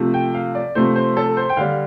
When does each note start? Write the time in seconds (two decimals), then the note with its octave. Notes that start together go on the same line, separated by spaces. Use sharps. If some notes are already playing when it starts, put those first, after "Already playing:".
Already playing: C3 F3 A3
0.14 G5
0.34 F5
0.55 D5
0.75 C3 F3 A3 C5
0.96 C5
1.17 A4
1.37 C5
1.49 G5
1.57 D3 G3 F5